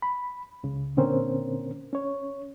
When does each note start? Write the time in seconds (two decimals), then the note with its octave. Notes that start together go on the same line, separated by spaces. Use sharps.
0.02 B5
0.64 C#2 C#3
0.97 A#2 D3 C4 C#4 A#4 C5
1.93 C#4 C#5